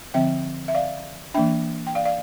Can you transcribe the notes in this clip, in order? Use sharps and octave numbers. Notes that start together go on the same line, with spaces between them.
D3 F3 C4 E5 G5
E5
D5 F5
E3 A#3 D4 E5 G5
G5
D5 F5
D5 F5